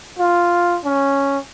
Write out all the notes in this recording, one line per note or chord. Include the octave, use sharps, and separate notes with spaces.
F4
C#4